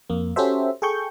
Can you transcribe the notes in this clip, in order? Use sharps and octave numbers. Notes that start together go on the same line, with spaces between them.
F2 A#3
C#4 F#4 G4 A4 C5 E5
G#4 A4 G5 C#6 G6